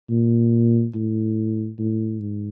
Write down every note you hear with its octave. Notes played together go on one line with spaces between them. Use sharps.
A#2
A2
A2
G#2